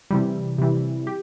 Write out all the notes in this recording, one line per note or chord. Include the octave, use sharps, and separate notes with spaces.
C3 E3 G3
C3 E3 G3
G4